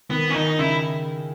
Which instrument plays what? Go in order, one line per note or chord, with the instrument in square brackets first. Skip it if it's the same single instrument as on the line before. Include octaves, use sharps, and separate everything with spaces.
[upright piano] D#3 [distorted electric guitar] B3
[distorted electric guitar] C#4
[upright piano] D#3 [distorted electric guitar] D#4
[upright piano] C#3 [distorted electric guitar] E4